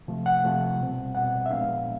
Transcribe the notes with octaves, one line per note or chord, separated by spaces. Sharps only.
C3 F3 A3
F#5
C3 F3 A3
B2 G3 C4
B2 G3 C4 F#5
E5
A#2 F3 G#3 B3 D4 F5